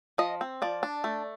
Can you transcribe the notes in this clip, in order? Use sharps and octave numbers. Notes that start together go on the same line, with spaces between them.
F3 D#5
C4
F3 D5
D4
A3